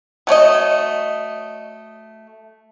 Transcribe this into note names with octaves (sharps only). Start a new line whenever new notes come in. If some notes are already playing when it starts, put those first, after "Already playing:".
F#3 A3 C#5 D#5